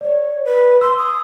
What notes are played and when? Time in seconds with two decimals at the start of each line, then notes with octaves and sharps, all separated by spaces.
0.01 C#5 D5
0.45 B4
0.81 C6 E6
0.98 D#6